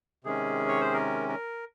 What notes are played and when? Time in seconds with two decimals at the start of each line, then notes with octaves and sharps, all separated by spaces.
0.24 C3 D#3 G#3 C#4 G#4
0.69 C#5
0.81 C5
0.93 A#4
1.29 A#4